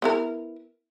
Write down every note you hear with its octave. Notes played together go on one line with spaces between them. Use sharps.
B3 E4 A#4